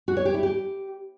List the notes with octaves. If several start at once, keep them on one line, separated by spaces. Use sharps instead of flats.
F#4
C#5
G4
E4
G4